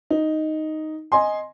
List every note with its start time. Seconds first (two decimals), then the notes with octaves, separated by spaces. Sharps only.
0.10 D#4
1.12 D#5 G#5 C6